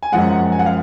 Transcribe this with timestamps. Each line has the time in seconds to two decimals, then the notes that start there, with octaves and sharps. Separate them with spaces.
0.03 G#5
0.12 F#2 F3 G#3 F#5
0.52 G#5
0.59 F#5
0.66 F5